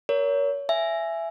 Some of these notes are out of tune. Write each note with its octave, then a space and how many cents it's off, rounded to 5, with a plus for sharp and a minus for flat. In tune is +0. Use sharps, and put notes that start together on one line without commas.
A#4 +5 C#5 +30
E5 +15 G#5 +5